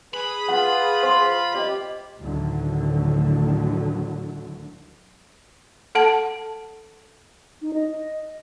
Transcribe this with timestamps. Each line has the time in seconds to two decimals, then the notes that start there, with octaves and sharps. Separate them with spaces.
0.14 G#4 B4 B5
0.49 F4 F#5
1.03 C5 C6
1.55 G4 D5 D#5
2.20 D2 A2 D3 D#3 F#3
5.95 A4 F#5 A5
7.62 D#4
7.74 D#5